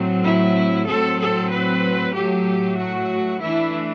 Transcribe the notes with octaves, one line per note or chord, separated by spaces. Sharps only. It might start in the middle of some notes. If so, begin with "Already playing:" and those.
Already playing: A2 F#3 A3 C4
E4
A2 F#3 C4 A4
A4
B4
A2 F#3 A3 G4
F#4
E3 A3 D4 E4